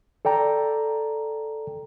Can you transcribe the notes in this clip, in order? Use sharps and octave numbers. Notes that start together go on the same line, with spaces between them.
A4 D5 G5 A#5